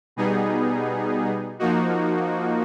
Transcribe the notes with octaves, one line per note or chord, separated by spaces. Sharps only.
B2 G3 B3 D#4 G#4
F3 A#3 D#4 F#4